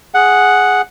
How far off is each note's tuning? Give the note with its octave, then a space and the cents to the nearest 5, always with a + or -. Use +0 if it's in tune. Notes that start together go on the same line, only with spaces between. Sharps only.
G#4 +0 F#5 +0